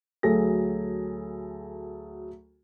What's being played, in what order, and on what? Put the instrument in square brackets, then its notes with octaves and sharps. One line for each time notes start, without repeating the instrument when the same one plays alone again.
[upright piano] D2 F#3 G#4 A4 A#6